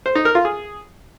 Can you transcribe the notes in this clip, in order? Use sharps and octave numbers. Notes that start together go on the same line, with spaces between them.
C5
D#4
A#4
F4
G#4